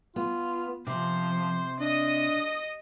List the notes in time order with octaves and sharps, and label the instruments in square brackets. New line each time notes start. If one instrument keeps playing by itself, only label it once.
[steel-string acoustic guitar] B3 [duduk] F4
[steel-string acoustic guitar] C3 [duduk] F3 [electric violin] C5
[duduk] D4 [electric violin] D#5 D#6